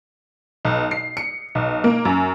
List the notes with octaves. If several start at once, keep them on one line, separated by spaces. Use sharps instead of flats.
B1
C7
C#7
B1
A#3
F#2